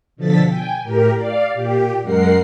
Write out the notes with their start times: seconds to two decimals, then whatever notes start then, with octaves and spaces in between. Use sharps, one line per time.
0.16 B2 D3 F3 A4 A6 B6
0.48 G5 G#5
0.83 A2 G4 A#4
1.14 D5 F5
1.54 A#2 G4
2.02 F#2 G#3 A#4 F#5 C7